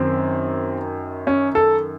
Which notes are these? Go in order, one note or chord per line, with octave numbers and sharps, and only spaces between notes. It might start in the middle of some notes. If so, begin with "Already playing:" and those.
Already playing: F#2 D#3 C4
C#4
A4